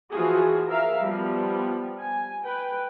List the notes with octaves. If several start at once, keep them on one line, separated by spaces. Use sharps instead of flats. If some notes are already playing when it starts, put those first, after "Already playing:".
E3 F3 F4 F#4 G#4
A#4 E5 F5
F3 G3 B3
G#5
B4 G5